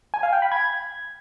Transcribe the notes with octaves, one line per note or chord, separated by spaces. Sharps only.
G#5
F5
G5
B5
G#6